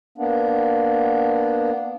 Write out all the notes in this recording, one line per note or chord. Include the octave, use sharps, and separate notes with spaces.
A#3 B3 D4